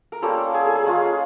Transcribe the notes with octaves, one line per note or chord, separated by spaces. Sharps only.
A#4
G3 A#3 C#4 F4 A4
G#4
A4
G#4
G#3 C#4 F4 G#4